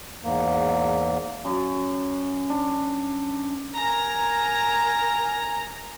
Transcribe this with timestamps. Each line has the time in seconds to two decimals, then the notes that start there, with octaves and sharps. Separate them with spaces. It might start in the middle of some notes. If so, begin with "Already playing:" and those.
0.24 E2 G#2 A#3
1.45 F#2
2.50 D4
3.77 A#4 G#5 A#5